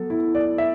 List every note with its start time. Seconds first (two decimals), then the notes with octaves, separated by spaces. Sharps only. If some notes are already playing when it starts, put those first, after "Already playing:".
Already playing: F#3 B3 A4
0.10 E4
0.35 D5
0.58 E5